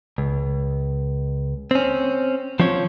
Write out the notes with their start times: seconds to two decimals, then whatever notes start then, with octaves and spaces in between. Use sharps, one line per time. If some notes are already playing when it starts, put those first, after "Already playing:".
0.18 C#2
1.71 C4 C#4
2.60 F3 C4 C#4 C#5